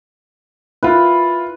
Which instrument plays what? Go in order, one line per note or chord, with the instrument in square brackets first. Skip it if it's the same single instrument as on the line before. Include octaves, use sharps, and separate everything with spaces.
[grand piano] E4 F4 [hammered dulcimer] B4